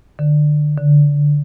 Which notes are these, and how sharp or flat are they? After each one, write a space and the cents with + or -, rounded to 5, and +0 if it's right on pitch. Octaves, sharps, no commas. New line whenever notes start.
D3 +25
D3 -10